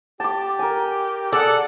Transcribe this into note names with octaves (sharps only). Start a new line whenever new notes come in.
G4 A5 D6
A#4 G#5
G#4 A4 D5 F#5